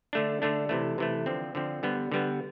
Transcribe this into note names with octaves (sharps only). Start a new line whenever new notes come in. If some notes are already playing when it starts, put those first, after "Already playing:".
D3 A3 D4
D3 A3 D4
C3 E3 A3
C3 E3 A3
D3 F3 C4
D3 F3 C4
D3 G3 B3
D3 G3 B3